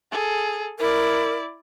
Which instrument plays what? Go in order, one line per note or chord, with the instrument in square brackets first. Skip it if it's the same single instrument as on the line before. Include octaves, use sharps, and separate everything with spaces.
[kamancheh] G#4 A4
[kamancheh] E4 D5 [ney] A#4